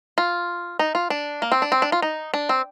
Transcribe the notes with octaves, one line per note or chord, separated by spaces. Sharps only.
F4
D#4
F4
D4
A#3
C4
D4
C4
D4
F4
D#4
D4
C4